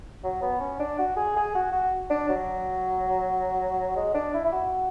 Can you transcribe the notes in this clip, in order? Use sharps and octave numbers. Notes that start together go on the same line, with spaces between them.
F#3
B3
C#4
D4
F#4
G#4
G#4
F#4
F#4
D4
F#3
G#3
D4
E4
E4
F#4